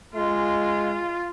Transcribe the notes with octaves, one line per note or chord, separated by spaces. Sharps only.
G#3 F4